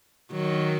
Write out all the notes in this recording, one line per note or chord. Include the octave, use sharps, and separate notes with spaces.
D#3 F#3